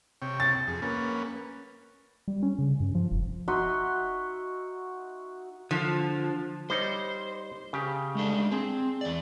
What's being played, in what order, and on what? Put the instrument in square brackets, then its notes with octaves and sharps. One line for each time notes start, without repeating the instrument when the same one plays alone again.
[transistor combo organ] C3 C#5 G5
[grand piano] A6
[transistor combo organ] F2 G#4
A#3 C#4 B4
[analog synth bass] G3
C#4
C#3
G2
F3
F1
[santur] D#4 F#4 E5 C6
[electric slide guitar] D3 [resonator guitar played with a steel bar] F3
[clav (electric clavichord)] G3 D#4 C#5 [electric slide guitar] C5
[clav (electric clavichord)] C#3 G4
[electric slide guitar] G#3 A3 D4
[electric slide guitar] C4 [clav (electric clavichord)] G#4
[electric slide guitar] E2 D5